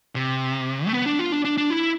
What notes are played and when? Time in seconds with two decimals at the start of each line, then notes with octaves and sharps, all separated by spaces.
0.15 C3
0.87 A3
0.93 B3
1.06 D4
1.19 F4
1.32 D4
1.45 D4
1.57 D4
1.70 E4